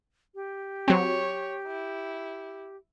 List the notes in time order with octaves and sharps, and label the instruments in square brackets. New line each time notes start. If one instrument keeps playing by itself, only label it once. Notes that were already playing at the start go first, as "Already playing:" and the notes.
[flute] G4
[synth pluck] F#3 C4 [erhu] C#5
[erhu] E4